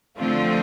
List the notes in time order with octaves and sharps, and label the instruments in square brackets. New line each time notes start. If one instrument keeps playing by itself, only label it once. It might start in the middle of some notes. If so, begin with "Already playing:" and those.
[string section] D3 F3 A3 C4 F4